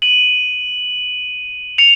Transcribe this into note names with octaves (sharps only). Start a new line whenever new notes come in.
D#7 F#7
C#7 F7